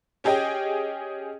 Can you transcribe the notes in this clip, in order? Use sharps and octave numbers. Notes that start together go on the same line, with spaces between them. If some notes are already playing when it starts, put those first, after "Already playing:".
C#4 G4 G#4 D#5 G5